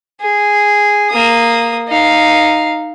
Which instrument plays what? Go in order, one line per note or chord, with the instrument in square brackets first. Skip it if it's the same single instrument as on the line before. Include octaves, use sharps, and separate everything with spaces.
[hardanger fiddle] G#4
A#3 D#6
D#4 F5